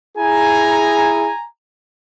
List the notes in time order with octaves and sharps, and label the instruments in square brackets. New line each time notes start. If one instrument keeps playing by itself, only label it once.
[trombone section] E4 G#4 [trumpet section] G#5 A#5